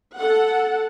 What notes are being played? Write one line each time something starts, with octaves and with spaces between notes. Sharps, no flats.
A4 F#5